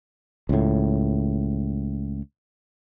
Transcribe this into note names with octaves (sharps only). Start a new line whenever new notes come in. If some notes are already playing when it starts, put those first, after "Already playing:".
C#2 A2